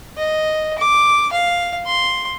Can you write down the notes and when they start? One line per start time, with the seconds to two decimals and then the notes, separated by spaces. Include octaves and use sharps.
0.17 D#5
0.78 D6
1.32 F5
1.87 C6